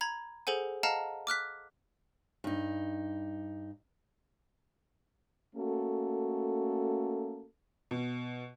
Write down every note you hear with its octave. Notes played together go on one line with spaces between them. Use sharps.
A#5 B5 G#6
G#4 A4 C5 F#5 G#5
D#5 F5 F#5 A5 A#5 F6
D6 F6 F#6 B6
G2 D#4
A3 A#3 C#4 F#4 A4
B2